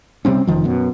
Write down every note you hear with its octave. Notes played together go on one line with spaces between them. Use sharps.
C3 G3 C4 C#4
F1 D#3 F3
F#2 B2